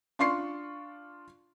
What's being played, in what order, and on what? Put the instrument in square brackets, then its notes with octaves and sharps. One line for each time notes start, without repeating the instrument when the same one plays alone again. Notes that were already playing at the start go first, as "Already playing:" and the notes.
[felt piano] D4 F4 D5 C6 C#6 C7